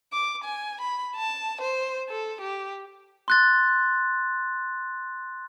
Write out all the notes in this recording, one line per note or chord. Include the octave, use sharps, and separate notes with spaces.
D6
G#5
B5
A5
C5
A4
G4
C6 F#6 A6